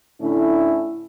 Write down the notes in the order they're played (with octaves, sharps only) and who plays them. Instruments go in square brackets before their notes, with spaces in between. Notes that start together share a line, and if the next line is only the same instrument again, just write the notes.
[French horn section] A2 D3 A3 C#4 E4